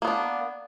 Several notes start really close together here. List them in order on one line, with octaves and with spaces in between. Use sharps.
A#3 B3 D4